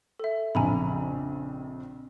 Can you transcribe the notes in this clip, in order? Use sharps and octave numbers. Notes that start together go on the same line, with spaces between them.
A4 E5
A#1 F2 C#3 G#5 A#5 B5